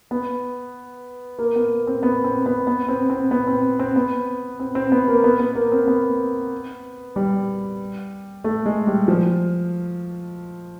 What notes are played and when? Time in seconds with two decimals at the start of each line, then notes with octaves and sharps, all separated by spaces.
0.11 B3
1.39 A#3
1.56 B3
1.87 C4
2.03 B3
2.24 C4
2.46 B3
2.67 B3
2.88 C4
3.10 C4
3.31 B3
3.47 C4
3.79 C4
3.96 B3
4.60 C4
4.75 C4
4.92 B3
5.08 A#3
5.24 B3
5.40 B3
5.55 A#3
5.72 C4
5.88 B3
7.16 G3
8.44 A3
8.66 G#3
8.87 G3
9.08 F3